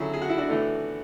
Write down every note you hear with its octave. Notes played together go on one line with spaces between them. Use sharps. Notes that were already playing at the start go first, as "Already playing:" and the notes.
Already playing: D2 C#3 F#3 A3 E4 G#4
G#4
F#4
E4
D4 F#4
A2 E3 A3